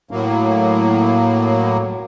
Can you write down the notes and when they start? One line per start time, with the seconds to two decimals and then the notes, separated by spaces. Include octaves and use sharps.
0.11 A2 F#3 A#3